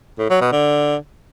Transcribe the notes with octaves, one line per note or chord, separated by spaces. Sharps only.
A2
F#3
B2
D3